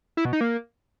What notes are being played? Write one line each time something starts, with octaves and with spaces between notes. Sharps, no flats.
E4
B2
D#4
A#3